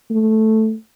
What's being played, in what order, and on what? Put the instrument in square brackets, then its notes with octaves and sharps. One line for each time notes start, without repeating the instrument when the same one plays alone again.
[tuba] A3